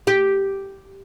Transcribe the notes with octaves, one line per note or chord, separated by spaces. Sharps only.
G4